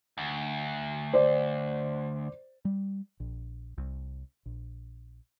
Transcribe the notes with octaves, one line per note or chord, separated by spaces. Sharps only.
D2
C5 D5
G3
A#1
C2
A#1